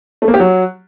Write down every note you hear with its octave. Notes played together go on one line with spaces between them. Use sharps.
A3
A#3
G4
F#3